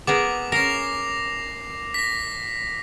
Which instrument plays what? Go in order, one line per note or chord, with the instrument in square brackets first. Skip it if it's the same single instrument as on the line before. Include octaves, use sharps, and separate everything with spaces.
[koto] B3 G#4 A#4 [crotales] D6
[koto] C#4 A#4 [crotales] A#6 C7 F7
[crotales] A#6 B6